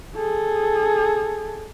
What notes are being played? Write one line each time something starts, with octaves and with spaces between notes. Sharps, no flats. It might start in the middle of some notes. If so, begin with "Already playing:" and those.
G#4 A4